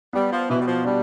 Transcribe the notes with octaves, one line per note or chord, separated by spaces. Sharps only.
G3 B3
F3
B2 E3
G3
F3
G3 D4